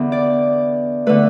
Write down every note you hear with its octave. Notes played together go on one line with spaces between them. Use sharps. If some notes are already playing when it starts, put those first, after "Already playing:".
Already playing: E2 D3 B3
D5
D3 A3 B4